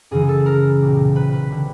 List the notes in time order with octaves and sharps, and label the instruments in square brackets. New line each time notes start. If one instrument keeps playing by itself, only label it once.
[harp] F#2 C#3 E3 G#4
A4
A#4
B1 A#2 G3
B4
B4
D3 G3